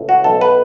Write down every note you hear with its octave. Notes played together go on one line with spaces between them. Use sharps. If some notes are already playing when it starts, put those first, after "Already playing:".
Already playing: C#2 A2
F#4
B1 A4
B4